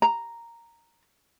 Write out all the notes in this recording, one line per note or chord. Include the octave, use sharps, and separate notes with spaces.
A#5